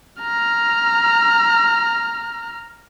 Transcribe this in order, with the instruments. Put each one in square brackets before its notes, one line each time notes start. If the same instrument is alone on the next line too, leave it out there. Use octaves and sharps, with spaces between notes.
[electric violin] A#5 F6